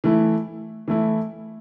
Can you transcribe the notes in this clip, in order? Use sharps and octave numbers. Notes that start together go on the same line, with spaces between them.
E3 A3 E4
E3 A3 E4